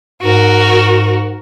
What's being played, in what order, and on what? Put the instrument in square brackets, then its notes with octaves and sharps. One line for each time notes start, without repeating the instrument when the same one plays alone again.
[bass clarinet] G#2 [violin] F#4 A#4